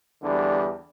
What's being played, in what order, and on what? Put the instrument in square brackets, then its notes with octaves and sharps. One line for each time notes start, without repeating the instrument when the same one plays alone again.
[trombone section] E2 D3 G3 D4